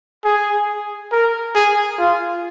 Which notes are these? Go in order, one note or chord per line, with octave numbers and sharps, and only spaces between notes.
G#4
A#4
G#4
F4